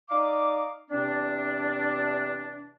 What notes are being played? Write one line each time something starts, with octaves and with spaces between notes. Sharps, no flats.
D#4 D5 F5 D6
E2 C3 C4 D4